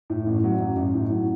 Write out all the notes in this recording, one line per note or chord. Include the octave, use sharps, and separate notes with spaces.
A2
A1
F#3
A1
A1
A2
F#3